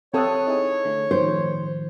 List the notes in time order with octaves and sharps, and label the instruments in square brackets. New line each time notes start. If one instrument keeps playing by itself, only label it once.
[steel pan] C4 A4 [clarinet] C#5 [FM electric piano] G5 D#6 F#6
[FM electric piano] D#4 E4 G#4
D3 A3
[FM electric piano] A2 D#3 F3 [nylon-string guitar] C5